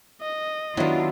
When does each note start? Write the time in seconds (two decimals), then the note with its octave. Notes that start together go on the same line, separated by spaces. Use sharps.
0.21 D#5
0.77 D#3 F#3 B3 D4 E4 F4 D#5